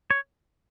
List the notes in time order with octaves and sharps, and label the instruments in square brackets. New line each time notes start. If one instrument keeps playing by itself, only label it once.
[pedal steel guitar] C#5